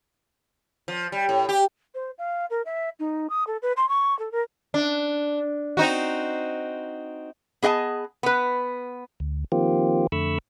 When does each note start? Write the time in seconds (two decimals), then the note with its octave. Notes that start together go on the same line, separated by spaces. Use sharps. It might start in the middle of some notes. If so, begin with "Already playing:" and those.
0.88 F3
1.12 G3
1.29 A2
1.49 G4
1.95 C5
2.18 F5
2.50 A#4
2.66 E5
2.99 D#4
3.30 D#6
3.47 A4
3.62 B4
3.77 C6
3.89 C#6
4.19 A4
4.32 A#4
4.74 D4
5.77 C4 D#4 F#4
7.62 B3 G#4 D#5 F#5 A5
8.23 B3 B4
9.20 D2
9.52 D#3 F3 A#3 C4 F4 G4
10.12 F2 D3 A3 B5 C#6 E6